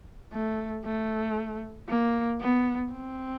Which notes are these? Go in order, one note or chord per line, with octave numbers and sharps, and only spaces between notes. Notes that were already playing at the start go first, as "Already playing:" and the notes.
A3
A3
A#3
B3
C4